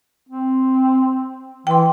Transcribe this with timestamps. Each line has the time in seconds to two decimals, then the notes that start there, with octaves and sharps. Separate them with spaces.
0.29 C4
1.67 E3 G5 C6